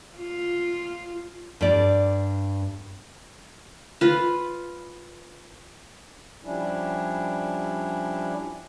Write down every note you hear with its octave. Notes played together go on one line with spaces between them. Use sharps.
F4
G2 D5
F4 B4
F3 G3 C#4 D4 E4